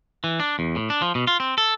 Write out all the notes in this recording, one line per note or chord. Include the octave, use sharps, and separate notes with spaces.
E3
D4
E2
A2
D4
F3
B2
F4
C4
A4